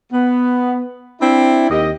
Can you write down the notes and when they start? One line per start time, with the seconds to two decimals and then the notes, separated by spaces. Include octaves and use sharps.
0.12 B3
1.21 C4 D4 E4
1.70 D#2 G4 D#5